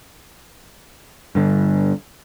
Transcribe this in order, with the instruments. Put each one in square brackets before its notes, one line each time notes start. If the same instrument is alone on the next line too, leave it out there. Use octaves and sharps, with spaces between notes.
[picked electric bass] G2 D3